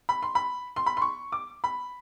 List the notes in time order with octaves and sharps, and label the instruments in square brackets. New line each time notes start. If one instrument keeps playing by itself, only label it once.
[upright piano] B5
C6
B5
C6
B5
C6
C#6
D6
B5